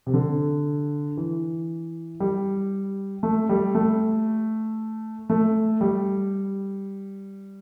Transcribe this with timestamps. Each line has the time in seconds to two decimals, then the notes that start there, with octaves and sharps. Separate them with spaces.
0.07 C3
0.14 D3
1.17 E3
2.20 G3
3.23 A3
3.49 G3
3.75 A3
5.30 A3
5.81 G3